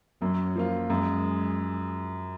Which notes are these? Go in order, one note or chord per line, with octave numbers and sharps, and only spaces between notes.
F#2 F#3
F3 A#3 F4
F#2 G#3